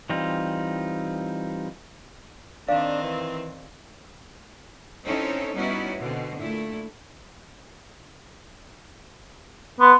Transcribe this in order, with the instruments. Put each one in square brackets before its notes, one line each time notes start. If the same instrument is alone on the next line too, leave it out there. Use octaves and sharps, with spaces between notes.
[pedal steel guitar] E3 G3 C4 D#4 F4
[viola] D#3 C4 [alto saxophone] D4 [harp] D5 [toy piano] F5
[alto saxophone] E3
[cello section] C4 C#4 D#4 E4 A4 C#5
G3 B3 C#4 D#4 E4 F#4
B2 D3 C4
A#2 A3 E4
[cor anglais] B3 [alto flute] C6